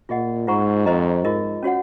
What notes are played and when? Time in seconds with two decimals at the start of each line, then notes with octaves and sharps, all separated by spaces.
0.09 A#2 F4 G#4 D#5 F#5
0.47 G#2 F4 C5 F#5 A#5 C#6
0.86 F2 C5 D#5 A#5
1.24 G#2 F4 A#4 D#5
1.63 C#4 F#4 C#5 F#5